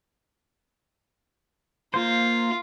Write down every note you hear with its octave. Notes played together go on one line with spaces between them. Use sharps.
A#3 F4 C5